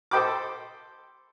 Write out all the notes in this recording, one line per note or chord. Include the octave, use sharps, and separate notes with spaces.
A4 C5 D#5 G5 B5 D6